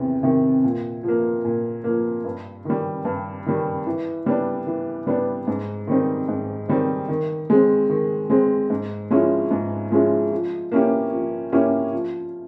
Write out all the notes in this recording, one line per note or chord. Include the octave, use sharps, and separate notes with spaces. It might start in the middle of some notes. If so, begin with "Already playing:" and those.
Already playing: E2 C3 D#3
C3 D#3
A#2
F3
A#3
A#2
F3 A#3
G2
D#3 G3
G2
D#3 G3
E3
G3 B3 D4
E3
G3 B3 D4
G#2
D#3 G3 C4 D#4
G#2
D#3 G3 C4 D#4
D#3
G#3 C4
D#3
G#3 C4
G#2
F3 G#3 C#4 E4
G#2
F3 G#3 C#4 E4
F3
A#3 C#4 E4 G4
F3
A#3 C#4 E4 G4
F3